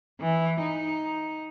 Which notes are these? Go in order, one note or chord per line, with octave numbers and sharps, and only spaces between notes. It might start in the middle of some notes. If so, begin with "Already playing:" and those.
E3
D#4